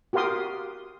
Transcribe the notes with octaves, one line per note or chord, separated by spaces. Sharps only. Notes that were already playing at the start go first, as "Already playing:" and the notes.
F#4 G4 A#4 F5 C6 D#6